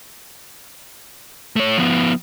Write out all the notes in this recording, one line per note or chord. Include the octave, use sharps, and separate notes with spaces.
A3 C#5
F3 B3